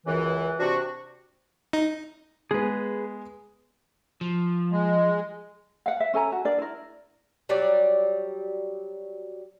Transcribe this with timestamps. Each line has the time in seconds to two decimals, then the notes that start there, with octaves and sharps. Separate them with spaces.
0.07 C#2 F#2 E3
0.60 C3 D4 F#4
1.73 D#4
2.51 G#3 B3 G#4 B4
4.21 F3
4.72 G#3
5.86 F5 F#5
6.00 E5
6.14 C#4 A4 G#5 A#5
6.32 F#4
6.45 D4 A#4 D5
6.59 E4 A#4
7.49 F#3 G3 D5